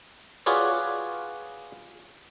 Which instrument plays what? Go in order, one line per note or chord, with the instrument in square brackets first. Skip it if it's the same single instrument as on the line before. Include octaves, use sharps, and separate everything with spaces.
[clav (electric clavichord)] F4 F#4 G#4 B4 C#5 D5